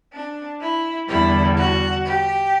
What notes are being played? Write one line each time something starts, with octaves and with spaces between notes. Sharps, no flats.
D4
E4
E2 D3 G3 E4
F#4
G4